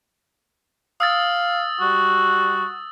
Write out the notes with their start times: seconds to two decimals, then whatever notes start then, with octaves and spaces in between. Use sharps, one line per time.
1.00 F5 D#6 E6 A6
1.81 G3 F#4